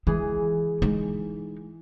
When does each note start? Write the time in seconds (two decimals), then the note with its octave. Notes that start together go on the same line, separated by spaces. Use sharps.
0.07 E3 G#3 G#4
0.82 G#3 D#4